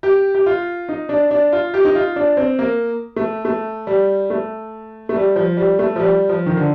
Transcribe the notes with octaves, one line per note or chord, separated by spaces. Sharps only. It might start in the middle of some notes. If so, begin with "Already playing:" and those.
G4
G4
F4
D#4
D4
D4
F4
G4
D#4
F4
D4
C4
A#3
A3
A3
G3
A3
A3
G3
F3
G3
A3
F3
G3
F3
D#3
D3